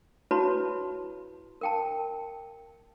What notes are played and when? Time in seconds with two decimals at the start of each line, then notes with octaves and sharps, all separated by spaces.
0.31 E4 F#4 B4 C#5 A5 B5
1.61 A#4 G5 A5